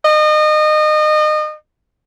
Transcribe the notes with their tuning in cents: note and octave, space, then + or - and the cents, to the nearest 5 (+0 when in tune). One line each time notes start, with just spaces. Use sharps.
D#5 -30